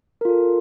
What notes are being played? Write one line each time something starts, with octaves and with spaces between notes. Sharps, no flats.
F4 A4 A#4